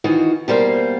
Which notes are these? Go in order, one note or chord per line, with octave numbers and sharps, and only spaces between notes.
D#3 E3 F4 F#4 D#5
B2 G3 A#3 C5 F5